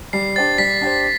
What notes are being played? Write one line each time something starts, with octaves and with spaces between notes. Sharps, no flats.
G3 C7
D4 G4 C5 A6
G3 B6
D4 G4 C5